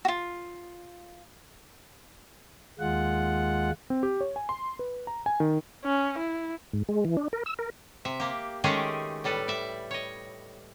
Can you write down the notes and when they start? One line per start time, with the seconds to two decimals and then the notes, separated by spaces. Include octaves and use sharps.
0.05 F4 F#4
2.79 D#2 G#3 F4 F#5
3.90 C4
4.03 G4
4.21 C#5
4.36 G#5
4.49 C6
4.79 B4
5.07 A#5
5.26 G#5
5.40 D#3
5.85 C#4
6.18 E4
6.73 G#2
6.89 G#3
7.05 E3
7.17 D4
7.33 A#4
7.46 E6
7.59 A#4
8.05 C3 E5
8.20 A#3 G4
8.64 D#3 G#3 A3 C#4 G4 G#4
9.24 A2 G3 A4 B4
9.48 D5 E5
9.91 C#5 D#5